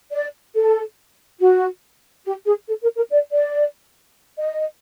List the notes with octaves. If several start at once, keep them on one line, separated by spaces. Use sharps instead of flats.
D5
A4
F#4
G4
G#4
A4
A#4
A#4
D5
D5
D#5